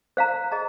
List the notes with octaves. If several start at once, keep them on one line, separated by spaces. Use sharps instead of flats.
C5 F5 A#5
G#4 D#5 A#5